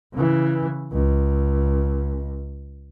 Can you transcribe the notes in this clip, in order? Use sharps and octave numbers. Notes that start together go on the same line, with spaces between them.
C#3 E3
C#2